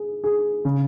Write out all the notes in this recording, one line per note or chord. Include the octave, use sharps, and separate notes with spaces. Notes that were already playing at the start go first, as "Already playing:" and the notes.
Already playing: G#4
G#4
C#3